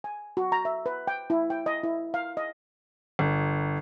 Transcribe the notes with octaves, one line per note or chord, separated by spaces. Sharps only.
G#5
F#4
A#5
E5
B4
G5
E4
G5
D#5
E4
F5
D#5
G1